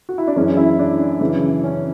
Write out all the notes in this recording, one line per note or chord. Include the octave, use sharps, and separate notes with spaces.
F#4
E4
D4
F#2 E3 G#3 C#4
E4
D4
F#2 C#3 E3
C#4